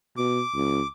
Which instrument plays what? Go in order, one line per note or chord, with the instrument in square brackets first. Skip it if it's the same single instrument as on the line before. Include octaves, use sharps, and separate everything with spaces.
[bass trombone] B2 [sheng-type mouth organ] D6
[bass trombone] C#2